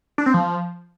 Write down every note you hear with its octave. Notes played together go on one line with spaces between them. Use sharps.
D4
C4
F3